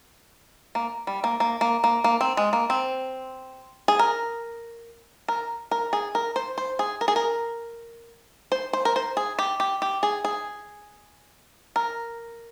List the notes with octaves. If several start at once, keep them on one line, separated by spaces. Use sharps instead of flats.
A#3
G3
A#3
A#3
A#3
A#3
A#3
C4
G#3
A#3
C4
G#4
A#4
A#4
A#4
G#4
A#4
C5
C5
G#4
A#4
G#4
A#4
C5
C5
A#4
C5
G#4
G4
G4
G4
G#4
G#4
A#4